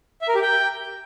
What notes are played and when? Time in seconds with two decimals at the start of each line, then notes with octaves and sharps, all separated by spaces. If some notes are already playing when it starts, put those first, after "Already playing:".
0.22 E5
0.28 A#4
0.35 G4
0.42 G5